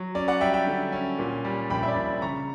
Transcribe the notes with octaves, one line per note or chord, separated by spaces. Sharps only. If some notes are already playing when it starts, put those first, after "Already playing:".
Already playing: F#3
C#4 D5
D5 F#5
G3 E5 G5
E5 G5
D3
C#4
A#2
G3
A#1 G5 B5
E5
D5
A#1
C#3 A#5 C#6